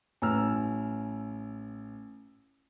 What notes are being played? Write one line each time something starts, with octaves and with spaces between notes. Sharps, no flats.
A1 A#5 E6 F6